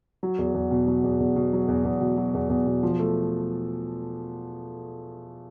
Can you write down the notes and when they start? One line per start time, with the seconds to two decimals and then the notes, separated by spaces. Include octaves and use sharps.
0.23 F#3
0.39 E2
0.54 E2
0.71 B2
0.88 F#3
1.04 E2
1.20 E2
1.36 B2
1.53 F#3
1.68 E2
1.85 E2
2.01 B2
2.17 F#3
2.34 E2
2.49 E2
2.66 B2
2.83 F3
2.99 A3